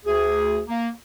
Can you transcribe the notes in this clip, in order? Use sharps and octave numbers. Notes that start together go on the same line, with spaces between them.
D2 G#4
A#3